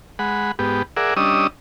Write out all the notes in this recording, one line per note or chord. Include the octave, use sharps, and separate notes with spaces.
G#3 F#5 B5
G#2 B3 G4
G#4 A#4 D5 E5 F#5
G3 C#4 D4 D#5 D#6 E6